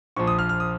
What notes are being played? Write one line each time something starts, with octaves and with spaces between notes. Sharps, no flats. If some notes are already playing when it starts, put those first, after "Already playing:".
A#1 A#2 F3 C#6
D#6
F6
F6
D#6